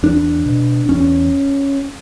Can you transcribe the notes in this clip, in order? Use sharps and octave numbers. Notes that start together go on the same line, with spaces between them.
E2 D4
B2
E2 C#4